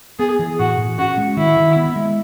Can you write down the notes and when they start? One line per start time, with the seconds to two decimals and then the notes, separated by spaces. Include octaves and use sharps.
0.19 B3 G#4
0.39 E3
0.59 A2 F#4
0.78 A2
0.98 C#4 F#4
1.18 G#3
1.37 D#3 E4
1.57 D#3
1.76 B3
1.96 G#3